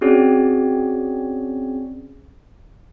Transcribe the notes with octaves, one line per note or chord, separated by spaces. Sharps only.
C4 C#4 F#4 G#4 C#5 D5